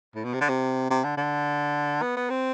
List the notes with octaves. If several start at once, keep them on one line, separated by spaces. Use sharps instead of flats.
A2
B2
C3
D3
C3
C3
D3
D3
B3
B3
C4